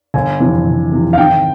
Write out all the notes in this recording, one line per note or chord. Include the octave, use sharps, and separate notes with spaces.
G1 G#5
F2 C3 E3
G1
F2 C3 E3
F5
G#1 G5